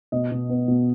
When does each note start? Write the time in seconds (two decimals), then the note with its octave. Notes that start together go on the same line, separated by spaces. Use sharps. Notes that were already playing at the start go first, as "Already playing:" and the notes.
0.12 B2 D#5
0.31 B2
0.49 B3
0.68 B2